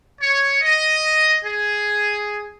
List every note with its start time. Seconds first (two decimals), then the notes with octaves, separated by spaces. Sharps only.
0.21 C#5
0.61 D#5
1.45 G#4